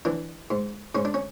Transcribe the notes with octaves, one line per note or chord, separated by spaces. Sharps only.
E3 D4
G#2
G#2 C#4
D4
C#4